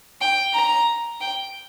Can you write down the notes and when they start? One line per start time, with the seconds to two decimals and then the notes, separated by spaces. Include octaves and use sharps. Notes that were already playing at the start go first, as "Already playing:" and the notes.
0.21 G5
0.55 A#5
1.21 G5